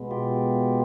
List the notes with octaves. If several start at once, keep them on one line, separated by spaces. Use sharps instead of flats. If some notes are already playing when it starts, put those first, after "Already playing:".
Already playing: B2 G#3 B3
F4 G4